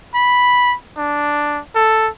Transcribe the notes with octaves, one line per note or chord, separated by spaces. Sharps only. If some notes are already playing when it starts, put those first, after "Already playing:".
B5
D4
A4